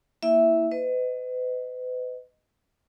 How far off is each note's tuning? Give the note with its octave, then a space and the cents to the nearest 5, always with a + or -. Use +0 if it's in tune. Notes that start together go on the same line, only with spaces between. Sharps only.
A#3 +0 E4 -10 E5 +0
B4 +40 D#5 +0